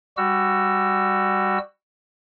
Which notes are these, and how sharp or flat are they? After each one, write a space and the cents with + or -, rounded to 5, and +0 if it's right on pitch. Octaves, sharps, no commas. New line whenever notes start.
G3 +15 F#4 +5 E6 +20